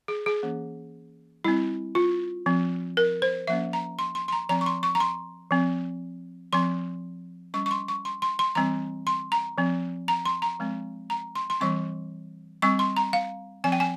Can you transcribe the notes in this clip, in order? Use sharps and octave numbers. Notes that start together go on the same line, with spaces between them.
G#4
G#4
E3 A#3 C#4
G3 C4 E4
F4
F3 C4
A#4
C5
F3 A#3 C#4 E5
A#5
C6
C6
C6
A#5
F3 C4 A#5
C#6
C6
C#6
A#5
C6
F3 C4
F3 C4 C6
G3 C#4 C#6
C#6
C6
C#6
C6
C6
C6
E3 G3 C4 A#5
C6
A#5
F3 C4
A#5
C6
A#5
F3 G#3 C4
A#5
C6
C6
E3 G3 C4 C#6
G3 C4 C#6
C6
A#5
F5
F3 C4 G#5
G5
G#5